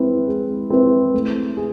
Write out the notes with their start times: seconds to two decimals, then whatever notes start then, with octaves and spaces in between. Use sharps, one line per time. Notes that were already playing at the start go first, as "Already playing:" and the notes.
Already playing: G#3 C4 E4 B4
0.27 G#3
0.70 C4 E4 B4
1.14 A3
1.57 G#4